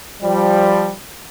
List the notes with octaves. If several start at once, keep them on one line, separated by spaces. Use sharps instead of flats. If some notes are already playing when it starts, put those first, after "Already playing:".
F3 G3